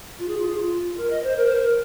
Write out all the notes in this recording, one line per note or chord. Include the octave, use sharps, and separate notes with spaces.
F4
G#4
F4
G#4
F4
A#4
D#5
C5
A#4
C5
A#4